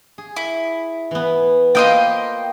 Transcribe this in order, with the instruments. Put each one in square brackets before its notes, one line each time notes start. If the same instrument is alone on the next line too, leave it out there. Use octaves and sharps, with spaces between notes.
[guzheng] G#4
[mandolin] E4
[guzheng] E3 B3
[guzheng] A#3 F4 B4 [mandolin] C5 D#5 G5